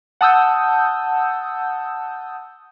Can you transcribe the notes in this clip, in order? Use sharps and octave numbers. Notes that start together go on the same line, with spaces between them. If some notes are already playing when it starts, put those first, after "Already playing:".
F#5 A5 D#6 E6 G6